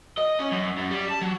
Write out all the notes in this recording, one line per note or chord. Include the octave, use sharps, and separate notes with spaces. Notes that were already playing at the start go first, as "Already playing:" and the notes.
D#5
C#4
F#2
F#2
G3
A5
F#3